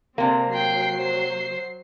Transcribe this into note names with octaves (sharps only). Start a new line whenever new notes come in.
C3 A#3 C4 D4
F#3 G5 C7
C5